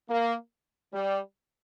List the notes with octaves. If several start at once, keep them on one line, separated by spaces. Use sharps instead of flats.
A#3
G3